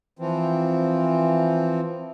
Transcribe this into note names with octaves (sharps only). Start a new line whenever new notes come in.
E3 F3 C4